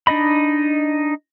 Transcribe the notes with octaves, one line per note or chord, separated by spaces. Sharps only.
D4 D#4 D#5 B5